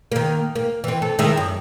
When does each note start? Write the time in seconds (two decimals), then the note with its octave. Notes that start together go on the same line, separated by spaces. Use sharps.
0.12 D#3 A#3
0.55 A#3
0.84 E3 C4
1.02 A4
1.19 D#3 G#3 E4
1.37 F#2